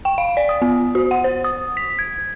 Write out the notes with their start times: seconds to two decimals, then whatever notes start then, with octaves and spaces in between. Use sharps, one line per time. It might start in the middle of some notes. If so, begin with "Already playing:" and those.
0.05 G5
0.18 F5
0.37 D5
0.49 D#6
0.62 B3
0.95 F#4
1.11 F#5
1.24 C5
1.44 D#6
1.77 B6
1.99 G#6